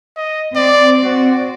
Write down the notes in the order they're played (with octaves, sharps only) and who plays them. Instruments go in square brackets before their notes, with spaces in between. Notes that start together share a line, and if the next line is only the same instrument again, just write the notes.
[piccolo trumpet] D#5
[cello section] C4 [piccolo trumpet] D5
[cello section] C4 D5 [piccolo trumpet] F#4